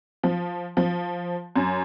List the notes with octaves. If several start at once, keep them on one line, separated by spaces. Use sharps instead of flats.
F3
F3
F#2